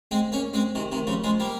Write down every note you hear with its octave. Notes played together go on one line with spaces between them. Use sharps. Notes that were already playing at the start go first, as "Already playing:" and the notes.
G#3 C4
A#3 C#4
G#3 C4
C3 D#3
C3 D#3
C#3 F3
F3 G#3
G3 A#3